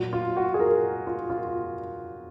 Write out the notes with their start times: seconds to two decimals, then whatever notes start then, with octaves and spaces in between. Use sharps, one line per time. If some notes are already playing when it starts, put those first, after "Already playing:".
Already playing: A#2 F#3
0.13 F4
0.37 F#4
0.54 G#4
0.60 A#4
1.07 F4
1.30 F4